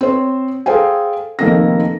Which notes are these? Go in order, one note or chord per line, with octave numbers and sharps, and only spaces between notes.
C4 C5 C#5
G#4 A4 C5 F5 G5 G#5
F1 D#3 A#3 C4 A4 A#6